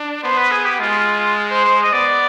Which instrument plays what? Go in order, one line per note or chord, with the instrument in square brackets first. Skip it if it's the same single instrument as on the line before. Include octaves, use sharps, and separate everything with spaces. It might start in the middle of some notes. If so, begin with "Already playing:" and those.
Already playing: [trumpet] D4
[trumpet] B3 [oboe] C5
[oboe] B4
G#4
G4
[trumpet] G#3 [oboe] F4
[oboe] F4
F4
C5
C5
D#5
[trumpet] B3 [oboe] D5